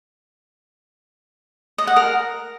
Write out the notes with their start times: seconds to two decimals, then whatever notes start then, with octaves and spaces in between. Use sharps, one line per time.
1.78 D#5
1.87 F#5
1.96 A#4